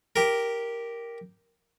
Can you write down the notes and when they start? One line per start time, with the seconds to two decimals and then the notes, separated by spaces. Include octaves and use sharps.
0.16 G4 A#4